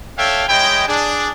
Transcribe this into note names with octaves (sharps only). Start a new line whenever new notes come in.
D4 A4 C#5 E5 F5 G5
G#3 E4 C#5 D#5 G5
D4 G#4